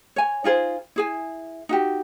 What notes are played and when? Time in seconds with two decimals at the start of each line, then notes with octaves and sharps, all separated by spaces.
0.16 C#5 G#5
0.44 D#4 F4 G#4 C5
0.96 E4 G#4 G#5
1.69 D#4 F#4 G4